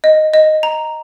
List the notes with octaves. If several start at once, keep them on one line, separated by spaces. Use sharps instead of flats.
D#5
D#5
A#5